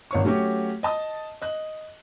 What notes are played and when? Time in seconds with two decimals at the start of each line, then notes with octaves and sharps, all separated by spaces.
0.11 G#1 C#5 C#6
0.25 F#3 A3 C#4 F#4 G4
0.83 D#5 A5 D#6
1.42 D#5 F#6